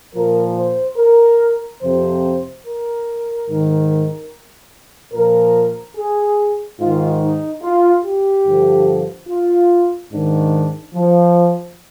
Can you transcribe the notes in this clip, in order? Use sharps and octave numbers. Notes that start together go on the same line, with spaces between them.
A#2 F3 A#4
C5
A#4
F2 C3 F3 C5
A#4
G#2 D#3
A#2 F3 A#4
G#4
G#2 D#3 F4
D#4
F4
G4
G2 D3 F3
F4
G#2 D#3 D4
F3